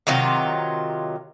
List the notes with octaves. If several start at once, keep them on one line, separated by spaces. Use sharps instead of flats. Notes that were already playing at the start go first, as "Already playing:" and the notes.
C3 D#3 F#3 F4